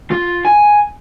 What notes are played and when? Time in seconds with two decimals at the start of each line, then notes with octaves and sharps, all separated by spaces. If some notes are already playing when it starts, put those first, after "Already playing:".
0.11 F4
0.45 G#5